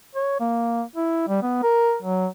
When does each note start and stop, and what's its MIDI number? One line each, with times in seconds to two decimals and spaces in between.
0.15 0.38 73
0.40 0.83 58
0.96 1.23 64
1.28 1.41 55
1.42 1.58 59
1.63 1.96 70
2.03 2.27 54